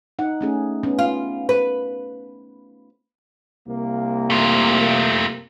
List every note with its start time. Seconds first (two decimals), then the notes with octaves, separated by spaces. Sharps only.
0.19 D#4 F#5
0.41 A3 C#4 G#4
0.83 B3 C#4
0.99 F4
1.49 B4
3.67 C2 A#3
4.30 A3 F4